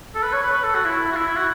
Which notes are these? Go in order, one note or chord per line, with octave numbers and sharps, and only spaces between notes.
A4
B4
C#5
B4
B4
A4
F#4
E4
F#4
E4
E4
F#4